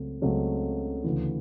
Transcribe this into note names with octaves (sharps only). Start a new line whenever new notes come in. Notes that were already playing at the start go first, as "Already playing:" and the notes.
Already playing: C#2 C#3 F#3 A3 C4
C#2 C#3 F#3 A3 C4
D2 C#3 E3